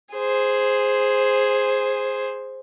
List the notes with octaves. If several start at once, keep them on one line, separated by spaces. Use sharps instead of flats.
G#4 C5